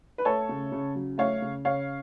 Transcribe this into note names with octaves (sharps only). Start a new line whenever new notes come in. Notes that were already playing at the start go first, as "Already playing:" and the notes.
B4
A3 A4 C#5
C#3
C#3
F#3
A3 C#5 F5
C#3
C#3 C#5 F5